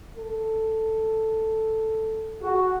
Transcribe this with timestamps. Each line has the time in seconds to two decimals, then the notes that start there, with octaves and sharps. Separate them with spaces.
0.17 A4
2.42 F#4 G#4